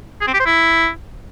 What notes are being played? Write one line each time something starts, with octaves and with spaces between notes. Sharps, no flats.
G#4
C4
G4
C5
E4